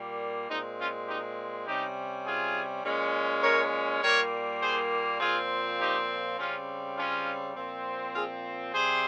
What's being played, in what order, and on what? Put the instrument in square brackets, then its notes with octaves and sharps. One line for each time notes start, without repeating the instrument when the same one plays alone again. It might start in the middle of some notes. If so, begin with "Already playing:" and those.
Already playing: [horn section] A#2 G3 A#3
A#2 G#3 C4 D#4
C#4 F4
D#4 G4
C3 G3 C#4 D#4 G4
F4 G#4
A#2 G#3 C#4
A#4 C#5
A#2 G3 A#3 A#4 C#5
G#4 C5
A#2 F3 C4 F4 G#4
D#4 G4
C#3 G3 C4 C#4 F4
C#4 F4
A#2 F3 C4
F4 G#4
C3 G3 C4 G#4 C5